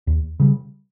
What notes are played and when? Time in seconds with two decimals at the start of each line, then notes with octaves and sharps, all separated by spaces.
0.07 D#2
0.40 C#3 G3